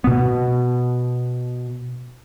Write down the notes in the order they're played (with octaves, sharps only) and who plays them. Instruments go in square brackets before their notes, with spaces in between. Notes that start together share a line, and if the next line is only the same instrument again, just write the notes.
[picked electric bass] B2 B3